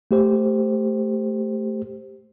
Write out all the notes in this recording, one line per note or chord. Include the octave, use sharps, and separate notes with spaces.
A3 G4 C5